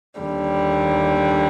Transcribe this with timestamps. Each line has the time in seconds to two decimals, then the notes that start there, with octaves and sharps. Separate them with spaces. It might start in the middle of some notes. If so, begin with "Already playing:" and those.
0.19 D#2 D3 G3